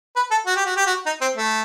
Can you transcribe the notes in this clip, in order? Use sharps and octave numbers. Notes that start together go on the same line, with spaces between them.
B4
A4
F#4
G4
F#4
G4
F#4
D#4
C4
A3